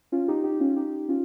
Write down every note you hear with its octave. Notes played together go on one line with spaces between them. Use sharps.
C#4 F4
D#4 G4
D#4 G4
C#4 F4
D#4 G4
C#4 F4